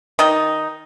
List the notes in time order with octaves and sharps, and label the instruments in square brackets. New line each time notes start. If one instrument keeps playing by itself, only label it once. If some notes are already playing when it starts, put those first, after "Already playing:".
[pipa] D#3 D#4